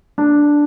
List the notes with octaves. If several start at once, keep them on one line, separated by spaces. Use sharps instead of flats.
D4